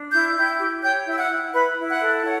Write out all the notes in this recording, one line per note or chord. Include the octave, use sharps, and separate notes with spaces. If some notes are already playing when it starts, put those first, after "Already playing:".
Already playing: D4
E4 G6
E4 G5 G6
G4
C#5 G5 G6
E4 E6
F#5 F#6
E4
E4 B4 B5
E4
F#5 F#6
A4
C#5 F#5